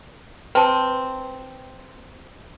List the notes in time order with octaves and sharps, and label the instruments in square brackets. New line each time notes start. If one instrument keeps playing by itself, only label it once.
[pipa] C4 [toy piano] B4 A5